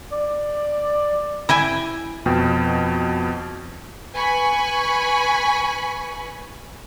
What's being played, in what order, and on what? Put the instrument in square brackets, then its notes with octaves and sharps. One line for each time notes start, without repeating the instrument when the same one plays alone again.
[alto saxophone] D5
[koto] E4 G5 G#5
[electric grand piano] F2 B2 G5
[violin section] B4 G#5 B5 C#6